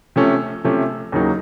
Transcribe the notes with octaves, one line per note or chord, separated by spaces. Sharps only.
C3 F3 A3 C#4
C3 F3 A3 C#4
D#2 C#3 F#3 A#3 D#4